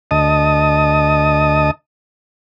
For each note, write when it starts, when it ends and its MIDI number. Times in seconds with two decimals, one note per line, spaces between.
0.11 1.71 38
0.11 1.71 75
0.11 1.71 81
0.11 1.71 87